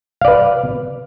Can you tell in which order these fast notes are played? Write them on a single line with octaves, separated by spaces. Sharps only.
F5 D5 B4